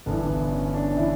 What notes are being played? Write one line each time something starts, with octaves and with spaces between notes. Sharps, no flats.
G1 G2 E3 B3
B3
C#4
D4
E3 E4